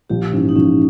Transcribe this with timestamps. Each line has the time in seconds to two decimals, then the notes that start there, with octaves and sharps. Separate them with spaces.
0.10 A#1 G4
0.32 G#2 E3 C#4
0.49 D#4
0.55 A#1 C#4